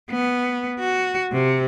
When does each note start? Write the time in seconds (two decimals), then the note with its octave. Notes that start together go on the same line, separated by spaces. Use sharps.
0.11 B3
0.79 F#4
1.32 C3